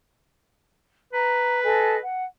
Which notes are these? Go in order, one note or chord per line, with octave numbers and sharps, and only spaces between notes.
B4 A#5
A4 D#5 G#5
F#5